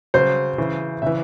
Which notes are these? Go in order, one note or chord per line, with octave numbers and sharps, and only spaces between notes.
C#3 F#3 C5
C#3 E3
C#3 E3 E5